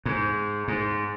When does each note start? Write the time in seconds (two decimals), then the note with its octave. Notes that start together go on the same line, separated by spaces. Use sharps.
0.05 G#2
0.68 G#2